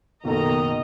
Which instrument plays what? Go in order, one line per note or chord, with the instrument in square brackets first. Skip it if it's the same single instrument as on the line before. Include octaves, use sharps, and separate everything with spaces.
[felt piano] F#1 B2 A4 [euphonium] D#3 [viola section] D#5 A#5